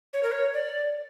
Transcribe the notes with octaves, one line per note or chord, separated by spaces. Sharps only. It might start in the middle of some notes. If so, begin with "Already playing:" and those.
C#5
A#4
C#5
D5